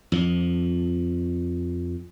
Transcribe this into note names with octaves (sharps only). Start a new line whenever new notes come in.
F2 F3